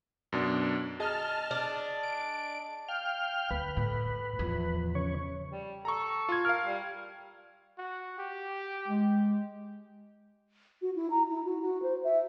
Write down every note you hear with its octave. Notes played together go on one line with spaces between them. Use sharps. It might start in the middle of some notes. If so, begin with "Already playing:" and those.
F#2 B2 D4
G#4 D#5 A5 F6
D4
D7
F5 G5 F6
D2 B4
A2
E2 F3
C#3 C#5
G3
A4 A#5 C#6
F4 G#6
A#4 F5 F6
G3
F#4
G4
G#3
F#4
E4
A#5
E4
F#4
F#4
C5
E5